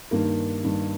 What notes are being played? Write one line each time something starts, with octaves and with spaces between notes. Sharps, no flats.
G2 D#3 A#3
G2 D#3